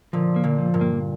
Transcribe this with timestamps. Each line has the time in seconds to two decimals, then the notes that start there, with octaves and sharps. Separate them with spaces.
0.13 A#2 D3 F3
0.36 A#3
0.44 A#2 D3
0.58 F3
0.74 G2 A#2
0.81 A#3